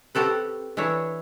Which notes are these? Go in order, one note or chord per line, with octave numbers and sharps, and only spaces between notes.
C4 F#4 G4 A4 B4
E3 D4 E4 C#5